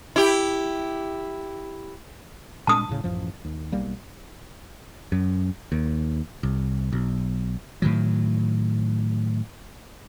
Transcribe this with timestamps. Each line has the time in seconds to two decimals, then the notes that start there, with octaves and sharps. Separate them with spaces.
0.16 E4 G4
2.67 A#2 G#3 D4 A5 D#6
2.89 D#1 A2 C#3
3.04 A1 F#2 F3
3.45 D#2
3.72 B1 G3 A#3
5.12 F#2
5.72 D#2
6.43 C2
6.92 B1
7.82 A2 D#3 F#3